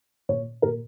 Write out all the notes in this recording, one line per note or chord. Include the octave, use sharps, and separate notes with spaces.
A#2 C#5
A#2 A#4